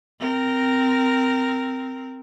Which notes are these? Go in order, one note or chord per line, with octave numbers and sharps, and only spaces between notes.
C4 A#4